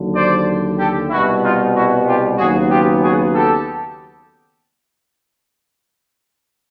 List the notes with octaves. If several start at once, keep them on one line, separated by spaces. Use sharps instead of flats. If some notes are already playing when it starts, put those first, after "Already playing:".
Already playing: D#2 D3 F#3
C5 D5
G4 A4
C2 B2 G3 B3 E4 F#4
D#4 F4
E4 F#4
F4 G4
D#2 C#3 F#3 B3 F#4 G#4
F4 G4
F#4 G#4
G4 A4